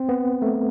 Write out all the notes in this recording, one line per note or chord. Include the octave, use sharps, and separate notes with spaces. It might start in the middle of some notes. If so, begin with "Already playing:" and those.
Already playing: C4
B3
A3